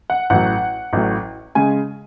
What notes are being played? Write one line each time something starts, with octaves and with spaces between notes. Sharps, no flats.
F#5
A1 A2 F#3 F#5
A1 A2 F#3
C#3 G#3 G#5